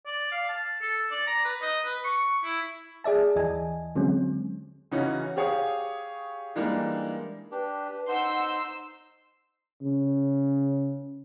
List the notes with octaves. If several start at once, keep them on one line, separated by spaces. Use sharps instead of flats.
D5
F5
A5
A4
D5
A#5
B4
D#5
B4
C#6
E4
G#4 D5 E5 A5
D#2 E3 D#5 G#5
D3 F#3 G#3 C4 C#4
C#3 E3 C#4 D#4 F#4
G4 G#4 C#5 F5 D#6
E3 G3 G#3 A#3 D4 D#4
D4 G4 B4
D#4 C5 F#5 C6 E6
C#3